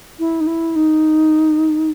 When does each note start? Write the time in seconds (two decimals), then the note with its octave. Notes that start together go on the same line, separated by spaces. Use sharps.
0.19 E4
0.41 D#4
0.47 E4
0.76 D#4